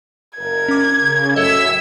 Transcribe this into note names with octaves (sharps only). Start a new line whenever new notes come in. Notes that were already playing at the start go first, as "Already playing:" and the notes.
F#1 A#4 G#6
C#4 D6
C#3 A#4
F#2 A2 A4 D#5 E5 E6